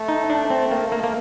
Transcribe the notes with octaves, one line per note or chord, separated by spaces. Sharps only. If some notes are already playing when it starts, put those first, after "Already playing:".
Already playing: A3
D#4
D4
C4
A#3
A#3
A#3